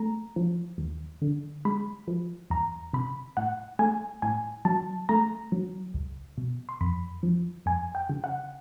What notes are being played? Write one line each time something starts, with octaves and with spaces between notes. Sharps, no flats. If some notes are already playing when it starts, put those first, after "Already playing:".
Already playing: A3 A#5
F3
D#2
D3
G#3 B5
F3
E2 A#5
C3 B5
A2 F#5
A3 G#5
A2 G#5
F#3 A5
A3 A#5
F#3
C#2
B2
C6
F2 B5
F3
F2 G#5
G5
C#3
F#5